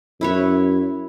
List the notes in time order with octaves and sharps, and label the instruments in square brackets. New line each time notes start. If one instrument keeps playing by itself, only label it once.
[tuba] F#2 [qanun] E4 B4 C#5